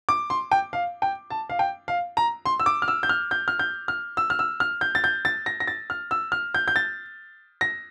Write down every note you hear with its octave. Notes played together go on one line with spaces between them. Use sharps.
D6
C6
G5
F5
G5
A5
F5
G5
F5
A#5
C6
E6
D6
F6
E6
G6
F6
G6
F6
G6
F6
E6
F6
E6
F6
G6
A6
G6
A6
A#6
A#6
A6
F6
E6
F6
G6
G6
A6
A#6